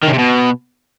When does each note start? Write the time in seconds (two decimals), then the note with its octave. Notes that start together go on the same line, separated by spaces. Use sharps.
0.03 D#3
0.08 C#3
0.13 C3
0.18 B2